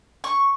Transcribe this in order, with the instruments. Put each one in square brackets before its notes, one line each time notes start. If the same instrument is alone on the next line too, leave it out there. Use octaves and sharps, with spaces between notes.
[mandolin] C#6